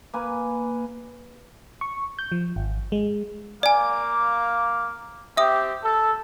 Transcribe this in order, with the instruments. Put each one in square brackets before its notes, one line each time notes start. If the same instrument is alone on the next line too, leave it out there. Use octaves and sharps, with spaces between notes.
[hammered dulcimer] A#3 B4 G#5 D6
[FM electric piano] C#6
G6
F3
G#1
G#3
[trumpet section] A#3 F5 D6 [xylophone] D5 G#5
[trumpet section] C4 G4 [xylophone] E5 D#6
[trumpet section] A4